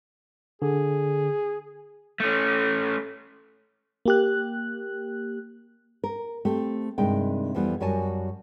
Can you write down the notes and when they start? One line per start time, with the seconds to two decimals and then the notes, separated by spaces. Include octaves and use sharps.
0.62 D3 G#4
2.20 A3 C#4
4.05 A#3 G4 F#6
6.04 A#4
6.45 A3 C4 G4
6.98 G2 C3 D#3 G#3 G5
7.55 F2 E3 G3 B3
7.80 F#2 G3 F#4 G#5 A5